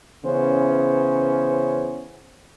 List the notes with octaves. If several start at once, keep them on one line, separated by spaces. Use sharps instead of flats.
C#3 E3 B3 C#4 C5